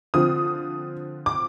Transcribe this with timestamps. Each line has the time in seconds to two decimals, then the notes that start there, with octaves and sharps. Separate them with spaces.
0.14 D3 F3 C4 F4 D#6
1.26 D6